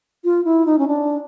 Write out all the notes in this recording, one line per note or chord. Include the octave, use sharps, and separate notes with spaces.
F4
E4
D#4
C#4
D4